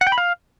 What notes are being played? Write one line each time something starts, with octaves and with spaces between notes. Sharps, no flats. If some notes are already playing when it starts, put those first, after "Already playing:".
F#5
G5
B5
F5